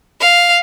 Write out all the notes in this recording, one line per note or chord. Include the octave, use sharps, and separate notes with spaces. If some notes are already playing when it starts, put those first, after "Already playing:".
F5